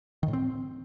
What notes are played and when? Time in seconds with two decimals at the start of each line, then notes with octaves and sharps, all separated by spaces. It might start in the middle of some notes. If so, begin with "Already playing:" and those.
0.23 D#3
0.28 A2
0.33 C4